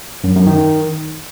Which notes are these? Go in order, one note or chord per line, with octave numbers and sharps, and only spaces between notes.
F#2
F#2
D#3